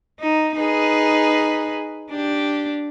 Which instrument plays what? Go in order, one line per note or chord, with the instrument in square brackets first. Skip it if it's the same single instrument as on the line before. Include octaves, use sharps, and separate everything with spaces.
[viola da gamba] D#4
D#4 G#4 B4
D4 G4